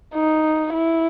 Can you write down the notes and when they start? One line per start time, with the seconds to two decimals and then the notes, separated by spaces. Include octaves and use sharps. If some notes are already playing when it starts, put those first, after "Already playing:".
0.14 D#4
0.73 E4